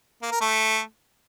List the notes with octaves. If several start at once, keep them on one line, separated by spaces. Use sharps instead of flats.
A#3
A#4
A3